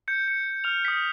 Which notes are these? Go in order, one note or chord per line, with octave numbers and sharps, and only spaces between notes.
G6 C#7
C#7
F6 F7
D#6 B6